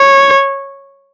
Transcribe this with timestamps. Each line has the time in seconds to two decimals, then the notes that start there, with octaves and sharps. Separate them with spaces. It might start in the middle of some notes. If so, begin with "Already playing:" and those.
Already playing: C#5